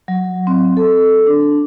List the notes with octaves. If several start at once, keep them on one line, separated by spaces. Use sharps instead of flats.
F#3
C4
A4
D4